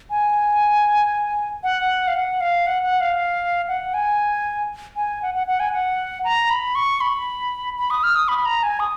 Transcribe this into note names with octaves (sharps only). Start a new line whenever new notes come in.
G#5
F#5
F5
F#5
F5
F#5
F#5
F5
F#5
G#5
G#5
F#5
F#5
F#5
G#5
F#5
A#5
B5
C#6
B5
B5
D#6
F6
D#6
B5
A#5
G#5
D#6